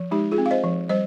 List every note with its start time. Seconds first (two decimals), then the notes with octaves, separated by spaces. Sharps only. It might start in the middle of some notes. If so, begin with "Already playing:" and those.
Already playing: F3
0.11 G#3 D#4 G4
0.31 F4 G#4
0.38 C4
0.46 F5
0.51 C5 D#5
0.64 F3
0.89 G3 C5 D#5